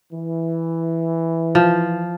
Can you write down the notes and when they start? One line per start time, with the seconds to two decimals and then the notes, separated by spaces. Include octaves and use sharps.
0.12 E3
1.55 F3